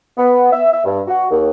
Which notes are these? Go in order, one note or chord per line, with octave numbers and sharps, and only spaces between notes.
B3
E5
E5
G2
F#4
D#2